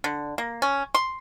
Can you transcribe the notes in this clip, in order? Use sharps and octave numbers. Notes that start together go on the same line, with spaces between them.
D3
A#3
C#4
C6